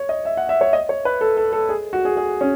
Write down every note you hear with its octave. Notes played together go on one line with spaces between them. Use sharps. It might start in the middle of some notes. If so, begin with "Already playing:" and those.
Already playing: C#5
D#5
E5
F#5
E5
C#5
D#5
C#5
B4
A4
A4
A4
G#4
F#4
G#4
G#4
C#4